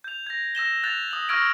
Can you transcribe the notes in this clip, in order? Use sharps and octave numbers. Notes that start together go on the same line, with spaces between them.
G6 F7
G#6 A#6
E6 A#6 E7 G7
F#6 G6 A6 F7
D#6 F#7
C#6 E6 F6 G#6 A#6 D7